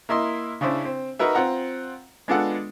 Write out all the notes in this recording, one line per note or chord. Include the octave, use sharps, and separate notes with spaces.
A#3 E4 D#5 C6
C#3 C#4 D4 E4 C5
C4
D#4 F#4 A#4 B4 E5
C4 F4 F#5 A#5
G#3 B3 D4 F4 A4 F#5